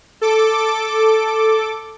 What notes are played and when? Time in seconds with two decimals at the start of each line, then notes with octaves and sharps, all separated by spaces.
0.21 A4 D6